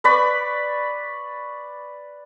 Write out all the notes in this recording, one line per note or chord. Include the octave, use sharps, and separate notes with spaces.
B4 D5 B5 C#6